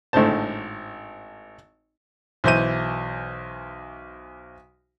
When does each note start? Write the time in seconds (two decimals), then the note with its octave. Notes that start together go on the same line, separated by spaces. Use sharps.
0.13 G#1 A2 D3 C5 A5
2.44 B1 E3 C5 E5 G6 D#7